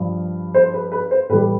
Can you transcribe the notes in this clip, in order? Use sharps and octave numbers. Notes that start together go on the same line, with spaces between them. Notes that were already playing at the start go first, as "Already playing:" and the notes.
Already playing: G2 F3
C5
B4
B4
C5
A2 E3 G3 B4